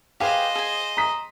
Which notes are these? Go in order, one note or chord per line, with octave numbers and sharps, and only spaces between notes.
G4 G#4 B4 C5 D#5 F5
G#4 G#5
A#5 D#6 B6